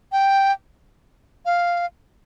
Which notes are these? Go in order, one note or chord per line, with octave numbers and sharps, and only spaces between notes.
G5
F5